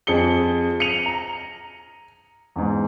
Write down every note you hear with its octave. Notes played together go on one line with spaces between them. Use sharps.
F2 G#4 C#7 G7
C#7 D#7 F7
A#5
E2 G#2